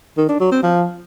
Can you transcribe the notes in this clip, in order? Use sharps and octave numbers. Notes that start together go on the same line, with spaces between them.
D#3
D4
F#3
C4
F3